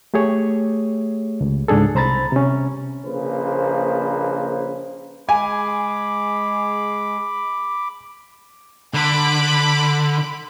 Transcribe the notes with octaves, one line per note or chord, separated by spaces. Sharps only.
A3 G4 G#4 C#5
C#2
C#2 G#2 D4 G#4 A4
C2 C5 A#5 B5 A6
C3 C#4
A#1 C#3 A#3 B4 C5
G#3 G#4 G#5 B5 D6
D3 B5 D6